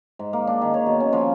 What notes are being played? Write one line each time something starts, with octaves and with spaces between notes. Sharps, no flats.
G#2
A#3
D4
D#3
C#5
B2
C#4
F3